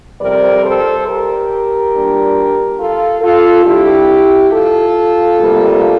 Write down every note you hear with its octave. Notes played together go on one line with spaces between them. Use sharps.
F2 C3 G3 C4 A#4 D5
A4 C5
G4 A#4
A#2 G3 D4
F4 A4
F4 A4
C3 G3 D4 E4 G4
F4 A4
D2 C3 G3 A#3